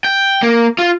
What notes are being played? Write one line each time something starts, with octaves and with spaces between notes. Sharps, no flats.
G5
A#3
F4